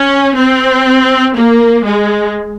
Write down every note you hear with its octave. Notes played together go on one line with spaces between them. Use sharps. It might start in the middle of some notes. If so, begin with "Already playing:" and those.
Already playing: C#4
C4
A#3
G#3